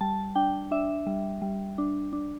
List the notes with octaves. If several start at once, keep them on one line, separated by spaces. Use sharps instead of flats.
G3 A5
D4 G5
D4 E5
G3
G3
D4
D4